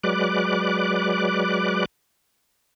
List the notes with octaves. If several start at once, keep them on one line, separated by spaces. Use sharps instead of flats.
F#3 G#3 B4 D5 D6 F#6